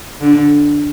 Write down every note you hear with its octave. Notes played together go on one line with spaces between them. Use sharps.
D3